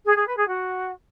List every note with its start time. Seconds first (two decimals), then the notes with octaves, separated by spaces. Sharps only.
0.06 G#4
0.16 G#4
0.26 B4
0.37 G#4
0.47 F#4